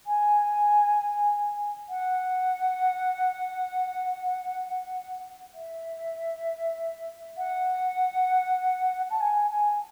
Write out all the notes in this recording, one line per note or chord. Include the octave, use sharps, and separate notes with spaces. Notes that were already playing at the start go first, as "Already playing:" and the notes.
G#5
F#5
E5
F#5
A5
G#5
G#5